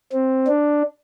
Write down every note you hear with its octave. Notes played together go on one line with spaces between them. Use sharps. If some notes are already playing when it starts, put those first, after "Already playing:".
C4
D4